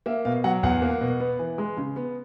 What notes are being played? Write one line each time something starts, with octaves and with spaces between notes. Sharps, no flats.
A#3 E5
B2 F5
F#3 F#5
E2 F#5
A#3
B2
B3
E3
G#3
C#3
B3